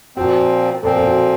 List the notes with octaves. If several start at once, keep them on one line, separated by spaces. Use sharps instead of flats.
A#2 F3 C4 F#4
A#2 F3 C4 A4
A4
F#4